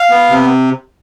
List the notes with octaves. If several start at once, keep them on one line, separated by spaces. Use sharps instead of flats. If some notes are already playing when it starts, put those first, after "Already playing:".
Already playing: F5
B3
C3